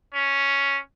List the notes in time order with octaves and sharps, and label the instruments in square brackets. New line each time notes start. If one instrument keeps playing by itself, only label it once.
[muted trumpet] C#4